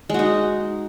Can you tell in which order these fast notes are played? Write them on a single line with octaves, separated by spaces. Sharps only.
G#3 F#4 D#4